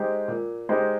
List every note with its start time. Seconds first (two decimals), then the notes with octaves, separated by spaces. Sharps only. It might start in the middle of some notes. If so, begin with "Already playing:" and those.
Already playing: G#3 D#4 G4 C5
0.28 A#2
0.69 G#3 D#4 G4 C5